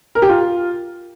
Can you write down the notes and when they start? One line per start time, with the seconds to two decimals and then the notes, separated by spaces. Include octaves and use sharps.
0.15 A#4
0.22 G4
0.29 F4